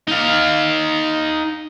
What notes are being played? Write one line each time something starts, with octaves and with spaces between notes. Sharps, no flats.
D#4 F5